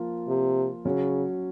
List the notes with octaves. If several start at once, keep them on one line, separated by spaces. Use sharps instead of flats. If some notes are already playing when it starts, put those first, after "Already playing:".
Already playing: F3 A#3 F4
C3
C#3 F#3 C#4 F#4